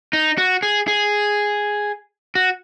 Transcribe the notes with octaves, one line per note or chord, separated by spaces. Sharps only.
D#4
F#4
G#4
G#4
F#4